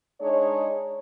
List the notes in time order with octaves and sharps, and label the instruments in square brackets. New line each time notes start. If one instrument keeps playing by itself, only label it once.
[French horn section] G#3 D4 D#4 C#5